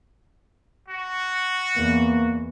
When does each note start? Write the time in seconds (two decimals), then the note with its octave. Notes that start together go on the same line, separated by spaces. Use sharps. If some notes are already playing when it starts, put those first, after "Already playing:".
0.88 F#4
1.77 E2 A#3